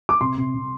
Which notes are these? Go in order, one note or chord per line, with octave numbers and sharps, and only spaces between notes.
D6
C3 C6
C3
C3